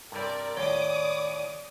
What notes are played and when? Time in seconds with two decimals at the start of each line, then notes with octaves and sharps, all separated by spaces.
0.12 G2 C3 G3 A#4 D5
0.57 D#2 A2 C#5 D5 D6 D#6